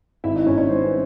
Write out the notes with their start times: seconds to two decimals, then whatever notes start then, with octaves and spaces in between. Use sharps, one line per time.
0.24 G#1 E4 E5
0.35 D#4 D#5
0.46 G#1 C#4 C#5
0.58 C#4 C#5
0.69 G3 C5
0.84 B4